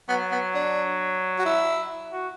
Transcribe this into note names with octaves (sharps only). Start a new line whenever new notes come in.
F#3 B3
B3
D4
F#4
E4
F#4